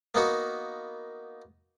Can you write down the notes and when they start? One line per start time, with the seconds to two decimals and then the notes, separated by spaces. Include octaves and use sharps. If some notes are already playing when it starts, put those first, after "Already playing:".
0.15 A#3 B3 D#4 F#4